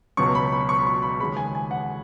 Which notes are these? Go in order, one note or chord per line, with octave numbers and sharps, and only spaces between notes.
C#2 B2 F#3 C#4 C#6
B5
B5
C#6
B5
C#6
B5
D#2 C#3 G#3 B5
G#5
G#5
F#5